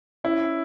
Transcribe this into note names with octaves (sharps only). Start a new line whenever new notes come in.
C#4 E4